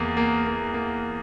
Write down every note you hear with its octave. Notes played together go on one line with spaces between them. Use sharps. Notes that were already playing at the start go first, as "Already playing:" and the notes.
Already playing: E2 A#3
A#3
A#3
A#3